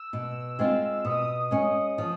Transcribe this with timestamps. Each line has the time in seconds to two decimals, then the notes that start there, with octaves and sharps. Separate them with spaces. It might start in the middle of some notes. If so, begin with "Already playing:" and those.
Already playing: E6
0.13 B2
0.59 G#3 C4 F4
1.05 B2 D#6
1.51 G#3 C#4
1.98 F3